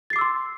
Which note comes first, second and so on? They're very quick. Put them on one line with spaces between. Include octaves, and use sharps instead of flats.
A6 C7 D6 E6 C6